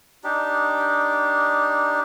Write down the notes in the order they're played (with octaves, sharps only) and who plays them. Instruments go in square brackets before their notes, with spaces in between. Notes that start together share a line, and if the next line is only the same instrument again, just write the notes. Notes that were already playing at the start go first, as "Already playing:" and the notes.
[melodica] D4 D#4 G4